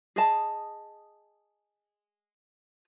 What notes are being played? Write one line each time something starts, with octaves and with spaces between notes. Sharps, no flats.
G#4 D#5 A5